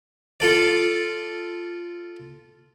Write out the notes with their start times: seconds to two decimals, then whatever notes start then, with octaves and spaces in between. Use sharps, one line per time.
0.40 F4 A4 D5